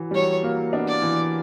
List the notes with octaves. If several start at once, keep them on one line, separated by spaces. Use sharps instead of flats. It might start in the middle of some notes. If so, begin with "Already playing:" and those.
Already playing: E3 F#3
G3
F#3 C#5
F#3 A#3
B3 D4
D5
E3